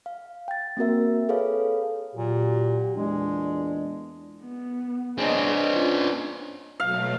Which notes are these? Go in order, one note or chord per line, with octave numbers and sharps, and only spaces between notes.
F5
G5 A6
A#3 C4 F#4 A#4 E5
G#4 A4 B4 C#5 F5
A#2 F#3 F#4 G4
E2 A#2 G#3 D4
B3
C4 D4 G#4 D#5
C#4 F4
B2 F#3 A3 F5